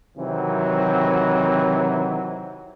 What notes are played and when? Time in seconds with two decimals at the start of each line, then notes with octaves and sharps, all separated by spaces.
0.18 C3 D#3 E3 F#3 C4